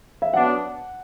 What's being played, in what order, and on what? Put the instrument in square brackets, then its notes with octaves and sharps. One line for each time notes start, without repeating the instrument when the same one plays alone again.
[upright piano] E5
[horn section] F#3 B3 D4 [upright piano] F#5